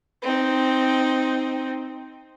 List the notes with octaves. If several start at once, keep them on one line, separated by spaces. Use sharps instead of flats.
C4 D#4